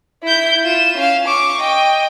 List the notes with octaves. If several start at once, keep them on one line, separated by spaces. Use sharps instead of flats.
E4 G6
F4 E7
C#4 F5
C#6 D6
D#5 G5